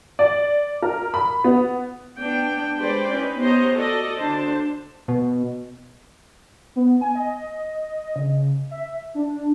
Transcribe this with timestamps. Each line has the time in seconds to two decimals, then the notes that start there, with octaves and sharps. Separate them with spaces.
0.19 D5
0.82 A#4
1.14 B5
1.44 B3
2.18 B3 D4 G5
2.77 G#3 G4 B4 C5 D5 G5
3.10 C#4 D#4 B4
3.40 B3 G4 C5 C#5 D#5 A#5
3.75 F#4 A4 D5 D#5
4.19 D3 D4 C5 A5
5.08 B2
6.76 B3
7.01 G#5
7.15 D#5
8.16 C#3
8.71 E5
9.15 D4